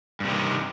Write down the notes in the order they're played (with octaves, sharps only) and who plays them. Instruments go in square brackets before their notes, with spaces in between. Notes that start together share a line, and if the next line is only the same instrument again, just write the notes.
[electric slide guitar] G2
C3
D#3